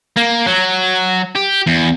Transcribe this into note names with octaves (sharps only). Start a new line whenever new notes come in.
A#3
F#3
G4
E2